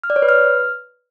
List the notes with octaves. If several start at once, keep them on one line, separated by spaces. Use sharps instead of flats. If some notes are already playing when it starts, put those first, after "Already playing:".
F6
D5
C#5
B4
F6